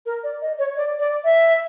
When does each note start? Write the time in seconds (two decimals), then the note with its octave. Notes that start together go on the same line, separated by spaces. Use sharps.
0.06 A#4
0.24 D5
0.42 D#5
0.59 C#5
0.77 D5
1.00 D5
1.24 E5